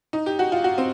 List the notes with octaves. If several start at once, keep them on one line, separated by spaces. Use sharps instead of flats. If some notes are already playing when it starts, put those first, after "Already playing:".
D#4
G4
F#4
F4
F#4
C4